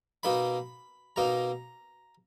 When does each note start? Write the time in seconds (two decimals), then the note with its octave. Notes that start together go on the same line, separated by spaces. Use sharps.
0.23 B2 A#3 D#4 B5
1.16 B2 A#3 D#4 A#5